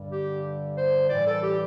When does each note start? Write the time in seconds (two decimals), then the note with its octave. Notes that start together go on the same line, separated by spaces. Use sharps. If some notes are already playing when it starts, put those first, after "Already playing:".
Already playing: G2 D3 G3
0.11 G4
0.78 C5
1.10 A2 E3 G3 D5
1.26 A4
1.43 G4